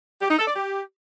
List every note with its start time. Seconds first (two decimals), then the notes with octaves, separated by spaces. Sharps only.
0.22 G4
0.30 D#4
0.39 A4
0.47 D5
0.56 G4